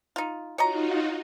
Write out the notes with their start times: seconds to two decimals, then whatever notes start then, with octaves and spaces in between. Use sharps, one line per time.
0.16 D#4 F4
0.58 D#4 F4 F#4 C#5 D#5 A#5